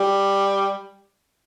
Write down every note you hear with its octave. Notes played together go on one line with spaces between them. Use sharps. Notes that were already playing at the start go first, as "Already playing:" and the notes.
Already playing: G3